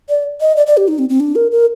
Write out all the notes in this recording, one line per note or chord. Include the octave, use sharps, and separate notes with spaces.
D5
D#5
D5
D5
G4
D#4
C4
C4
D4
A#4
A#4